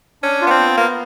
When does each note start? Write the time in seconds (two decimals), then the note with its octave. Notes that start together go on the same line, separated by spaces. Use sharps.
0.23 C#4 D4
0.41 F4
0.47 B3
0.50 C4
0.59 B3
0.78 A#3 B3